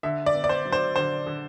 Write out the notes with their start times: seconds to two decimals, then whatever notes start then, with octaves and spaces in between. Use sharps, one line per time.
0.03 D3 E5
0.26 D5
0.34 B3
0.44 D5
0.49 C5
0.65 F#3
0.72 C5
0.96 D3 C5
1.26 D3